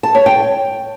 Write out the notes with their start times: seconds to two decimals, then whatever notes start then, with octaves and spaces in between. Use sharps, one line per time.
0.03 A5
0.15 C#5
0.26 G5